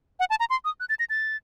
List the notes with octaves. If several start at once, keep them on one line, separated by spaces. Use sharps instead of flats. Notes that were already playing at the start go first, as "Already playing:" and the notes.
F#5
A5
A#5
C6
D#6
F#6
A6
A#6
A6